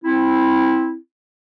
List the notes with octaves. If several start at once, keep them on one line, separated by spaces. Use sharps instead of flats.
C4 E4